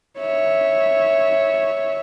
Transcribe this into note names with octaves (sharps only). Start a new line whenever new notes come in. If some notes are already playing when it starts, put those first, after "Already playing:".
C#5 E5